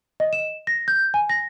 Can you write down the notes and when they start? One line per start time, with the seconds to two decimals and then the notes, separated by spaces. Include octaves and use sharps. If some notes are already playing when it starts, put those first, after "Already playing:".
0.20 D#5
0.33 E7
0.67 A#6
0.88 G6
1.14 G#5
1.30 A#6